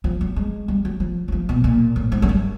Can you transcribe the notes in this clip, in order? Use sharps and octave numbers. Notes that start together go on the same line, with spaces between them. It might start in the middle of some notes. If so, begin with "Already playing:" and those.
F3
F#3
G#3
G3
F#3
F3
F#3
F3
B2
A#2
A2
G#2
F#2
G2